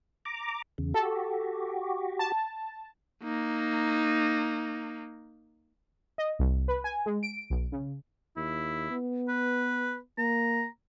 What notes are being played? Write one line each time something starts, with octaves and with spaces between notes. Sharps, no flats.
A#5 D6
E2 C#3
F#4 G4 A4
A5
A#3 D#4
D#5
C2
B4
G#5
G#3
D7
B1
C#3
D#2 E4
B3
B4
A#3 A#5